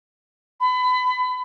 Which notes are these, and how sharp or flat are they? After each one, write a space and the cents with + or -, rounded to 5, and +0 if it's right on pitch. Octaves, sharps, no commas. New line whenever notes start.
B5 +30